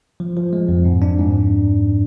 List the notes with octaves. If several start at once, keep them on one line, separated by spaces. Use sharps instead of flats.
F3
F3
G#3
F2
G#2
D4
G#2